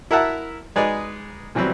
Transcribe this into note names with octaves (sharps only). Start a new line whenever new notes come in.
E4 A#4 E5 F#5 A5
G#3 D#4 G#4 B4 D5
B2 E3 F#3 G3 C4 E4